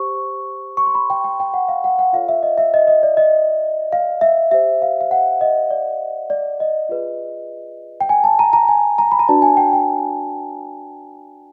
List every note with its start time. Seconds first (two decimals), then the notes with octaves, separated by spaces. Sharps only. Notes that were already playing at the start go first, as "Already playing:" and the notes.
Already playing: G4 C5 C#6
0.77 C#6
0.86 C6
0.95 B5
1.10 G5
1.24 G5
1.40 G5
1.54 F#5
1.68 F5
1.84 F#5
1.99 F#5
2.13 F4 A4 C#5 F5
2.28 E5
2.43 D#5
2.58 E5
2.74 D#5
2.88 D#5
3.03 D5
3.17 D#5
3.92 F5
4.21 E5
4.51 G4 C5 E5
4.82 F5
5.01 F5
5.11 F#5
5.41 D#5
5.71 D5
6.30 D5
6.60 D#5
6.89 F4 G#4 B4 D5
8.01 G5
8.09 G#5
8.24 A5
8.39 A#5
8.53 A#5
8.68 G#5
8.98 A#5
9.12 B5
9.19 A#5
9.28 D4 F#4 B4 D5 A5
9.42 G#5
9.57 G5
9.73 G5